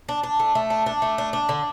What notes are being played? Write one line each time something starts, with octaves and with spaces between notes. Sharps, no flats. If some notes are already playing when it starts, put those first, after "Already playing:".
D4
D4
A3
A3
D4
D4
A3
D4
D4
D3